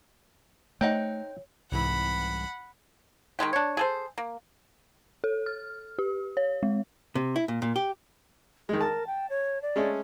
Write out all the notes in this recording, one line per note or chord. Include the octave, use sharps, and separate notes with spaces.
A3 C4 D#4 C#5 F#5 G5
C2 G#2 E3 F#5 B5
D#3 G3 G#3 G4
D4 C#5
G#4 A4 C5
A#3
A4
F6
G4
C#5
G#3
C3
E4
A#2
A#2
G4
D#3 G#3 G#4
A#4 A5
G5
C#5
D5
G#3 A3 C#4